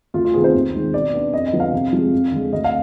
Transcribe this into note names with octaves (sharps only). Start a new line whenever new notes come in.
D2 F4
F4
C3 D#3 B3 G#4
C5
D#2
D#3 G#3
B2 D5
B3 D4
F2 D#5
D#5
D3 F3 B3
F5
C3
F3 G#3
F2
D3 G#3
D2 D#5
F5